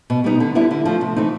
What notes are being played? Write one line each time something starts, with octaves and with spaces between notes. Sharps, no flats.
B2
G3 B3 D#4
D3
G3 B3 E4
D3
F3 A3
C3
E3 A3 C4 D#4